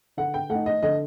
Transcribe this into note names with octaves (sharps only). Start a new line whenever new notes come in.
D3 F#5
G5
A3 D#4 F#5
D#5
D3 D#5